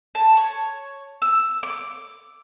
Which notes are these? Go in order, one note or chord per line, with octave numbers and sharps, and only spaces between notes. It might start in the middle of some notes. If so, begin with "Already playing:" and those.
A5
C#5
E6
D6